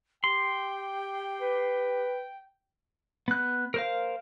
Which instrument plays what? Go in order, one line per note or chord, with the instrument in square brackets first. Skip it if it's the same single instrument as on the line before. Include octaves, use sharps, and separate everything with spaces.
[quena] G4 [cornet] G5 [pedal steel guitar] C6
[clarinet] B4
[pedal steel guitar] B3 F#6
A#4 C5 F5